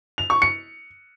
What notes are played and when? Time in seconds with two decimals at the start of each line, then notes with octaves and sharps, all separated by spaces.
0.18 F7
0.30 C#6
0.42 C#7